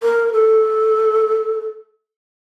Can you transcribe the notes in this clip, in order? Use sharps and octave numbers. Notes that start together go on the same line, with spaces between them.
A#4
A4